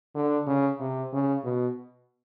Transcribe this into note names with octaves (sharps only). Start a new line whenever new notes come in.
D3
C#3
C3
C#3
B2